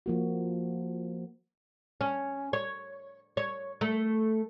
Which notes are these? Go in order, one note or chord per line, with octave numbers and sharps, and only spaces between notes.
F3 A#3 F#4
C#4
C#5
C#5
A3